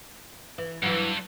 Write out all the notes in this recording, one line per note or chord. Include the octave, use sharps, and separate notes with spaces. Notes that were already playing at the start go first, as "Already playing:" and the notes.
E3
G2 E3 F#3